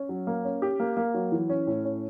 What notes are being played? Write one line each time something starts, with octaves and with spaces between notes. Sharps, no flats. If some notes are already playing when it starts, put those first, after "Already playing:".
Already playing: C#4
F#3
A#3
C#4
G4
A#3
A#3
F#3
E3
C#4
A2
C#4